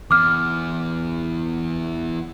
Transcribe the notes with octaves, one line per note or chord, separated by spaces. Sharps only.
E2 D6 F6